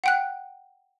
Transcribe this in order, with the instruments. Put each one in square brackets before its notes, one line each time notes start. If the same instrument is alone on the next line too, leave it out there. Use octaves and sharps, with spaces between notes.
[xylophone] F#5 G5 F#6